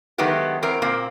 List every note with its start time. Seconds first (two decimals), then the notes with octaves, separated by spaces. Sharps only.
0.18 D#3 F#3 G#3 A3 B3 G4
0.63 E2 C4 A#4
0.82 A#2 A#3 C4